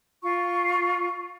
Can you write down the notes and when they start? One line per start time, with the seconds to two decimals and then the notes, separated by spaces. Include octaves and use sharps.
0.22 F4 C#6